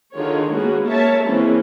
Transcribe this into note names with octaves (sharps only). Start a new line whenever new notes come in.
D3 D#3 F4 G#4 C#5
G#3 A#3 B3 C#4 F#4 G#4
A#4 C#5 E5 A5
E3 G#3 A#3 C4 C#4 E4